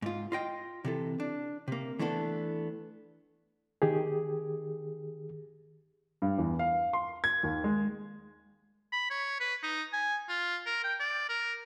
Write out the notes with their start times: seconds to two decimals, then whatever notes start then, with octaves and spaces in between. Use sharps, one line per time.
0.02 G#2 F4
0.32 F4 D#5 G5
0.85 C3 E3 A4
1.20 D4
1.68 C3 A#3
1.99 E3 A3 B3 D4 A4
3.82 D#3 G4 G#4
6.22 G2
6.38 E2
6.59 F5
6.93 C6
7.24 G#6
7.43 D#2
7.64 G#3
8.93 B5
9.10 C#5
9.40 B4
9.63 D#4
9.93 G#5
10.29 F4
10.66 A#4
10.84 G5
11.00 D5
11.29 A#4